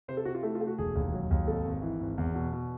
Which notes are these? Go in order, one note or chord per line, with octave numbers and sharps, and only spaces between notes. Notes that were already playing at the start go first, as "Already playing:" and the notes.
C3 C5
A4
C3 F#4
F4
A3 E4
F4
A3
F#4
E1 G#4
D#2
F#3
D#2
G#1 A4
G#1
E3
G#1
E2
B2
B2